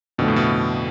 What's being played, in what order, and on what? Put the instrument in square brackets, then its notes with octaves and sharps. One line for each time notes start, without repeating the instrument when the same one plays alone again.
[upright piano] F2 D3 A3 [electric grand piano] B2
[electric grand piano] A2
B2